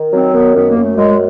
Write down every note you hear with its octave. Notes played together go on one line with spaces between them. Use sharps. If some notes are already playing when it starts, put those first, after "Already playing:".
Already playing: D#3
F#3 C4
D#3 B3
F#2 B3
A#3
F#2
A3
F#2 G#3